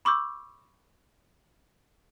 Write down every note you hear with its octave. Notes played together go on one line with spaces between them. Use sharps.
B5 C#6 D6 E6 G6